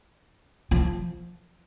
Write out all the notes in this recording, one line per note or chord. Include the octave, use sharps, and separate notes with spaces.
F3